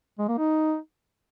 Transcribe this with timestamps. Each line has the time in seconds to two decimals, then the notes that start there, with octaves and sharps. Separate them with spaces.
0.19 G#3
0.28 A#3
0.38 D#4